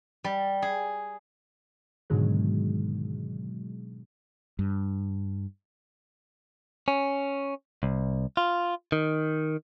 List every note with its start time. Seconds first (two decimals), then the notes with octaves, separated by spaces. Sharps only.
0.24 G3
0.62 G#4
2.10 G#2 B2 D3 D#3 F#3 G#3
4.59 G2
6.88 C#4
7.83 C2
8.37 F4
8.92 D#3